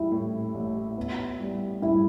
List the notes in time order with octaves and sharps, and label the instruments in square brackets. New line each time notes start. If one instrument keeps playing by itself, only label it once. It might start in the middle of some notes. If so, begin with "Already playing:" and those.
Already playing: [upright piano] G3 [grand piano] E4
[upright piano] A2
A1
B3
G3
[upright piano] G2 [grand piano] E4